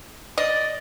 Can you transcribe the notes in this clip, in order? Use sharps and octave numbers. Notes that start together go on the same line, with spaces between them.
D5 D#5